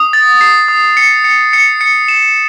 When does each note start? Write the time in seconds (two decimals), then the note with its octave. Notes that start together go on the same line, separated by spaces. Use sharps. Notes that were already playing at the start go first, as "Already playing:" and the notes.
Already playing: D#6
0.13 A6
0.41 C7
0.68 D#6
0.97 C#7
1.24 C#7
1.53 C#7
1.81 C#7
2.08 E7